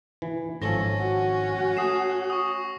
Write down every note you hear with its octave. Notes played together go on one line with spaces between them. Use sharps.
E3
G#1 F3 C#4 A4 A#6
F#4
A3 D#6 C7 E7
C#6 D#6